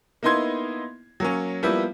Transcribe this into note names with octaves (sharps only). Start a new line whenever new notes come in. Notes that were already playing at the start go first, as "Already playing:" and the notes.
A#3 B3 D#4 E4 C6 G#6
F#3 A#3 C#4
F3 G3 A#3 B3 E4